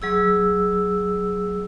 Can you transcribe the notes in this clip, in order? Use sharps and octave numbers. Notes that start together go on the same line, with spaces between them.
F#3 G#4 E6